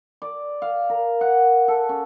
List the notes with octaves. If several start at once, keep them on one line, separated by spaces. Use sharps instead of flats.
D5
F5
A#4
F#5
A4
C#4